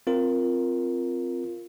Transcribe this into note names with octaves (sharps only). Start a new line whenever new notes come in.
C4 F4 A#4